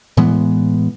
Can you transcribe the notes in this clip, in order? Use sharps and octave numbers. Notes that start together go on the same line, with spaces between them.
A2 E3 G#3 B3